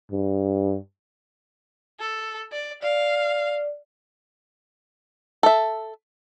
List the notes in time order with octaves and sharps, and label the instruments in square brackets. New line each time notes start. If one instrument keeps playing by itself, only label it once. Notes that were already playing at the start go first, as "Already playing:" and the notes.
[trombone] G2
[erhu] A4
D5
[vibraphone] D5 [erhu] F5
[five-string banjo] A4 E5